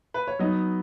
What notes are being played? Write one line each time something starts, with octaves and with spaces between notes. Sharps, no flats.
B4
C#5
F#3 B3 D#4 D#5